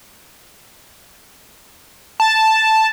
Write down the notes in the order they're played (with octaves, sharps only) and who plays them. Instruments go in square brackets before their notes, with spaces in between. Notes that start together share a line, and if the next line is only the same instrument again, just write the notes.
[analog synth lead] A5